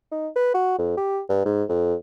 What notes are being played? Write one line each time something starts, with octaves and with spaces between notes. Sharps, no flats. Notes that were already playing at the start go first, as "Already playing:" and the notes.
D#4
B4
F#4
F2
G4
G2
G#2
F2